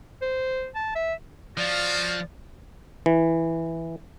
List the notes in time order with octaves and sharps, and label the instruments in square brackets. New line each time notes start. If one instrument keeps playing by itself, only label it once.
[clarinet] C5
A5
E5
[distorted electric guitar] F3 [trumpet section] G#3 F4 F#4 [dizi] D5
[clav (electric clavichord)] E3